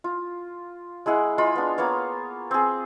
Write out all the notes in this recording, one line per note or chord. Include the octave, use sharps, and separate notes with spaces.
F4
G#3 E4 G#4 F#5
G#3 F4 B5
B3 D4
A#3 B3 C#5 F5
C4 G#4